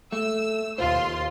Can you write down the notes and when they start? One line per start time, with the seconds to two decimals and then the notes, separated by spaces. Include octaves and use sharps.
0.12 A3 E6
0.78 D#2 F4 C5 F5 C6